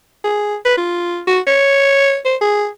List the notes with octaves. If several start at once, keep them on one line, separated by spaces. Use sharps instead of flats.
G#4
B4
F4
F#4
C#5
C5
G#4